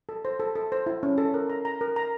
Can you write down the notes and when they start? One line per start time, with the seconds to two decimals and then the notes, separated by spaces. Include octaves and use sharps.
0.09 A4
0.25 C5
0.40 A4
0.55 A4
0.72 C5
0.86 E4
1.03 C#4
1.18 A4
1.34 A#4
1.50 A#5
1.65 A#5
1.81 A#4
1.96 A#5